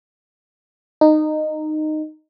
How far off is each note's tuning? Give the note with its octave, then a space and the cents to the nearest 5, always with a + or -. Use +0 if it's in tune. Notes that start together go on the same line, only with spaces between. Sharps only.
D#4 -15